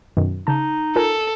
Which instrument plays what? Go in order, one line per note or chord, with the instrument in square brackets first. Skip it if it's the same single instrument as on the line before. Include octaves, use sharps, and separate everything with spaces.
[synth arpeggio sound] F#2 B2 D#3
[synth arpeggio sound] C#3 A5 [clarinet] D#4
[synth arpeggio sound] F4 A#4 G#5 [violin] A4